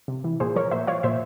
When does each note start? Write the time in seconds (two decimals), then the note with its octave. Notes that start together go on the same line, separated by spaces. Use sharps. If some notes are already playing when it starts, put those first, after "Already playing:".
0.08 C3
0.24 E3
0.40 A#2 G#4 C5
0.56 F3 A#4 C#5
0.71 A#2 C5 E5
0.87 F3 C#5 F5
1.03 A#2 C5 E5